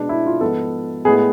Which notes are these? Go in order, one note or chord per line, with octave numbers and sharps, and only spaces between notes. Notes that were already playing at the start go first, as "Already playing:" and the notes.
Already playing: B2 G#3 B3 D4
E4
F4
G#2 F3 B3 A4
A2 G#3 B3 G#4